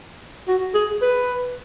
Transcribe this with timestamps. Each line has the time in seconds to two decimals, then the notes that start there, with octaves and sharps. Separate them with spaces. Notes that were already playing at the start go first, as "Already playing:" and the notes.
0.48 F#4
0.75 G#4
1.02 B4